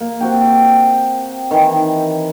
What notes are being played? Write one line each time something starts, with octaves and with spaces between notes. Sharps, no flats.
A#3
C4 F#4 G4
D#3 E3